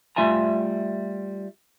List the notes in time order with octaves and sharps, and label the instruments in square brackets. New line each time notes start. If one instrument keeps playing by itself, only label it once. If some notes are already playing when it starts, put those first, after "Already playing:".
[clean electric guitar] G3 A3 F4 E5 G#5 A#5